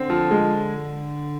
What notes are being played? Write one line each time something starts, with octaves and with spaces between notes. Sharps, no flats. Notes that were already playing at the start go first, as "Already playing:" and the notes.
Already playing: D3 C4
F3
G#3